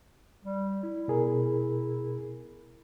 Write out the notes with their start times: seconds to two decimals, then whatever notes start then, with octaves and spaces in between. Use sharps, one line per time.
0.45 G3
0.83 E4
1.08 B2 G#4 A#4